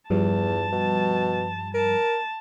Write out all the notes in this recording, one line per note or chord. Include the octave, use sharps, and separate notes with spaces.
E2 G2 F3 G3 A5
B2
A#4 A5